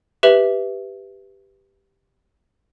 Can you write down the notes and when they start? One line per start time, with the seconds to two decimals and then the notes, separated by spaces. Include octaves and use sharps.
0.23 G4 B4 E5 F#7